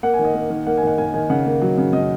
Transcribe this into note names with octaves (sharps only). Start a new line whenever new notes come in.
A#3 F#5
G#5
D#3
D#5
A#3
D#3
A#3 F#5
G#5
D#3 F#5
A#3 G#5
D#3 G#5
C#3 F#5
A#3
F#3
C#3
C#3 D#5